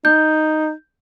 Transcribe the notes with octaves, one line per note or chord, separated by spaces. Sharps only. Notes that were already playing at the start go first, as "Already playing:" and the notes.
D#4 G6